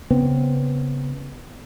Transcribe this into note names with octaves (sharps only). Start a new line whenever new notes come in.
C#3 B3 C4